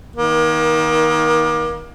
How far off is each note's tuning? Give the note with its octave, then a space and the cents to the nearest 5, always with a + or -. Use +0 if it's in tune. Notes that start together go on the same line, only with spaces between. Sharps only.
D#3 +20 A#3 +35